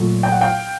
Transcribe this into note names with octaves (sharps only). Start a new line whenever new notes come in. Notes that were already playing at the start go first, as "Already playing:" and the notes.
Already playing: A#2 F#3 A3
G5
F#5
F5 G5